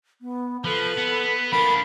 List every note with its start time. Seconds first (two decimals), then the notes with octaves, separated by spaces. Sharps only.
0.21 B3
0.65 F3 A4 B4
0.98 B3
1.52 F3 D4 A#4 B5